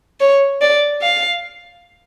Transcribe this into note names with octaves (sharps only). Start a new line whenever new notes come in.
C#5
D5
F5